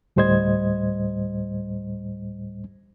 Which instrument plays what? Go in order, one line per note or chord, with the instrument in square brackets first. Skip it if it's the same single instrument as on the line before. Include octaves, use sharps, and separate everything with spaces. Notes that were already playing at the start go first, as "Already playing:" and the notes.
[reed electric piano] D2 A2 G3 C5 D#5 G#6